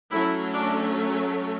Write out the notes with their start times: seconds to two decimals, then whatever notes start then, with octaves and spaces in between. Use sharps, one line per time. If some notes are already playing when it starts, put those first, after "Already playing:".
0.11 F#3 A3 C#4 E4
0.54 D4